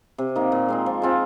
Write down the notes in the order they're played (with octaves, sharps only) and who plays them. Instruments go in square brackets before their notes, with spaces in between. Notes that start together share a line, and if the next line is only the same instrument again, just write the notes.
[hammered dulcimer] C3
D#3 A#3 D#4
A#2
G#3 C4 D#4
F3
G#3 C4 F4